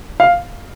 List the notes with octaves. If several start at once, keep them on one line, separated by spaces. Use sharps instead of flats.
F5